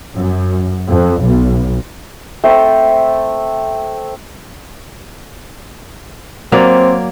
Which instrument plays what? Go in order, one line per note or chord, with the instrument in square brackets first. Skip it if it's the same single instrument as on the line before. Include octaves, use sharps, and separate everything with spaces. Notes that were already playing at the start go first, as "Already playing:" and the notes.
[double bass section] F#2
F2
B1
[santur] A3 C4 E5 G5
[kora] F#3 A#3 D5 [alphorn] C4